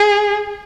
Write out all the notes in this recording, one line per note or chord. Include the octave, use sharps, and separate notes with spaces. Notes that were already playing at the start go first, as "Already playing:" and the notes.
Already playing: G#4